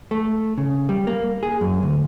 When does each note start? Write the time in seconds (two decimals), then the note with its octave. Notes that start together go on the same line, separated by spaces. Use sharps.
0.11 A3
0.58 C#3
0.89 G3
1.07 A#3
1.43 G#4
1.61 F#2
1.83 D2